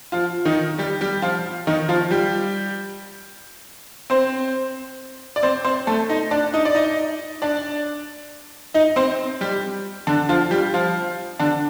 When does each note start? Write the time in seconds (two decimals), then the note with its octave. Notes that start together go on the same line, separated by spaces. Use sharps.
0.12 F3 F4
0.45 D#3 D#4
0.78 G3 G4
1.01 G3 G4
1.22 F3 F4
1.67 D#3 D#4
1.89 F3 F4
2.11 G3 G4
4.10 C4 C5
5.36 D5
5.43 C4 C5
5.64 C4 C5
5.87 A3 A4
6.09 D#4 D#5
6.31 D4 D5
6.54 D#4 D#5
6.65 D5
6.75 D#4 D#5
7.42 D4 D5
8.74 D#4 D#5
8.96 C4 C5
9.41 G3 G4
10.07 D3 D4
10.29 F3 F4
10.51 G3 G4
10.74 F3 F4
11.39 D3 D4